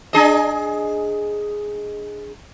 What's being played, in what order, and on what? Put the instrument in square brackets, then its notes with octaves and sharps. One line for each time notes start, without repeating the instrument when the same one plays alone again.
[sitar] D4 G#4 D#5